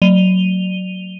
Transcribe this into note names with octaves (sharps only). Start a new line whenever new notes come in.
F#3 D#7 F7 G7